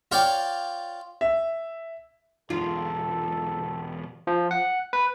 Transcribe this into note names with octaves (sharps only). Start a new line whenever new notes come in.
F4 C#5 D5 F5 G5
E5
B1 E2 F4 A4
F3
F#5
B4